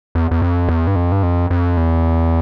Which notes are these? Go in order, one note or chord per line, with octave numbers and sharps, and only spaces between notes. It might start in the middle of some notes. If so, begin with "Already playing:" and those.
E2
E2
F2
E2
G2
F2
G2
F2
F2
E2